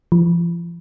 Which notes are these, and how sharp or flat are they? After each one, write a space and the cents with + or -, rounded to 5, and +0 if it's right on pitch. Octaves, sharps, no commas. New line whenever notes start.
F3 -40